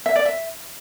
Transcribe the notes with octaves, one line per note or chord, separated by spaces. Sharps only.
E5
D5
E5